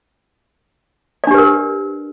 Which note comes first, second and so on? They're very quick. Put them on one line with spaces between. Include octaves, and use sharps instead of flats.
D5 D4 G4 B4 A#4